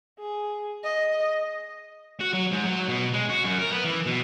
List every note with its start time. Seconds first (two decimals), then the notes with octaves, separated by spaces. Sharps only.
0.20 G#4
0.84 D#5
2.21 F#4
2.34 F#3
2.52 G#2
2.66 F#3
2.89 B2
3.13 G#3
3.29 F#4
3.44 F#2
3.59 A#4
3.71 B3
3.85 E3
4.06 B2